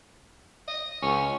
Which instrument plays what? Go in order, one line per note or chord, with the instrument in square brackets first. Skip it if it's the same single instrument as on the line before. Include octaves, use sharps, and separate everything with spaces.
[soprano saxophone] D#5
[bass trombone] C#2 [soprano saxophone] C#4